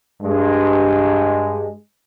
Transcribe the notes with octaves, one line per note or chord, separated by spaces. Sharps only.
G2 G#3